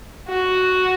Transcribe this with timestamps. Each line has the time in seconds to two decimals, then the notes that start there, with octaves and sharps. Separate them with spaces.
0.29 F#4